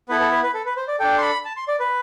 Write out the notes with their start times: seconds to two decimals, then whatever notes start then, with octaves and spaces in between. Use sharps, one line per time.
0.09 B3 E4 A4 B4
0.20 A4
0.31 B4
0.43 B4
0.54 A4
0.65 B4
0.77 C5
0.88 D5
0.99 D4 A4 G5
1.18 C6
1.22 B5
1.45 A5
1.56 C6
1.68 D5
1.80 B4